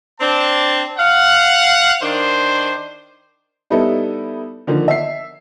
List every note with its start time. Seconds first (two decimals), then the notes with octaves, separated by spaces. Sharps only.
0.20 C4 D4 A5
0.98 F5 F#5
2.02 D#3 D4 C5
3.70 G3 B3 D#4 E4 A4
4.67 D3 D#3 F3 A#3
4.88 E5 C7